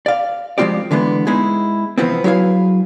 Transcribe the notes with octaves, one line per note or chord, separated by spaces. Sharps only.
D5 F5
F3 G#3 C4 F4 G4 D5
D3 E3 G#3 B3
G#3 B3 D#4 E4 G#4
C3 E3 F3 B3 C4
F#3 E4 G#4 B4 F5